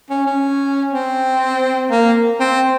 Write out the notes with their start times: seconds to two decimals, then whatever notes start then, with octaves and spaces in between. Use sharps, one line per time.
0.10 C#4
0.27 C#4
0.93 C4
1.91 A#3
2.40 C4